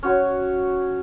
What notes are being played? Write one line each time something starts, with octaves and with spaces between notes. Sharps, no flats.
C#4 F#4 C#5